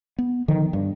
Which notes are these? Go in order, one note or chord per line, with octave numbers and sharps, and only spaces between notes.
B3
D3 D#3 F3
G2